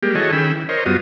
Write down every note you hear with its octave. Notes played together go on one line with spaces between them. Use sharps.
G3 G#3 A#3 G4
E3 F#4 G#4 A4 C#5 D#5
D#3 C#4 G#4 G5 B5 E6
E3
A#4 C5 C#5 D#5
F#2 G3 B3 F4 F#4 D#6